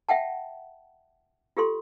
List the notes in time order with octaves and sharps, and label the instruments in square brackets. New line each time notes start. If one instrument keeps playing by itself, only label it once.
[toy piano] E5 F#5 G5 A5
F4 G4 A4 C6